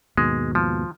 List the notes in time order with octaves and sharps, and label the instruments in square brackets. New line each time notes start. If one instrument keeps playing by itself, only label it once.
[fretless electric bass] D#2 G#2 B2 [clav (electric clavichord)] G#3
[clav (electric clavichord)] F3